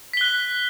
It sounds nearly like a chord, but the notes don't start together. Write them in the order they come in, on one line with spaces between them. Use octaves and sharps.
B6 G7 F#6